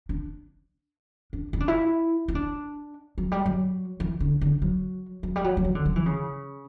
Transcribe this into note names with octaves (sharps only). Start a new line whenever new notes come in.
D4
D4
E4
D4
E4
E4
D4
F#3
G3
F#3
E3
D3
D3
F#3
F#3
G3
F#3
F#3
E3
D3
F#3
E3
C#3